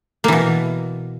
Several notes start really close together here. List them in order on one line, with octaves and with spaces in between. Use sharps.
A#3 E3 B2